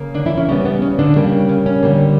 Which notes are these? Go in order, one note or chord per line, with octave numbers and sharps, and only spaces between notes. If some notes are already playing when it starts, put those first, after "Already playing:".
Already playing: C#3 A#3
D3 D4
E3 E4
C#4
C#3 G3 B3 C#4
B3
C#4
D3 D4
C#3 G3 A#3
C#4
C#4
D3 G3 A#3